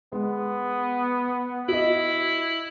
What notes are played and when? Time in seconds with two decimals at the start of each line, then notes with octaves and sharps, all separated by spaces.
0.12 G#3 B3
1.68 E4 F#4 D#5